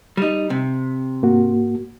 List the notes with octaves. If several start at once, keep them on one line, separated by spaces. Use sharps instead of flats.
G3 D#4
C3
G#2 A#3 F#4